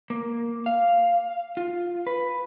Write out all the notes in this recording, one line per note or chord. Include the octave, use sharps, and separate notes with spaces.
A#3
F5
F4
B4